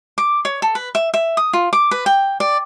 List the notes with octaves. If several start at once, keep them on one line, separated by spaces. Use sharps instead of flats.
D6
C#5
A4
B4
E5
E5
D#6
F4
D6
B4
G5
D5